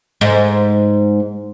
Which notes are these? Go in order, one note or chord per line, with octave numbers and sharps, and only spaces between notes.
G#2